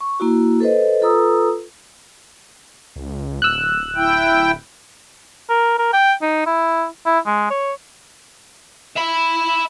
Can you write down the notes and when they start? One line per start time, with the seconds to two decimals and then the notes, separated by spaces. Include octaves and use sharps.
0.01 C#6
0.20 A#3 E4 F#4
0.60 A4 B4 C5 D#5
1.02 F4 A4 B4 A#5 D#6 E6
2.96 C#2
3.42 D1 E6 F#6
3.96 E4 G5
5.50 A#4
5.79 A#4
5.93 G5
6.22 D#4
6.46 E4
7.06 E4
7.26 G#3
7.50 C#5
8.97 E5 B5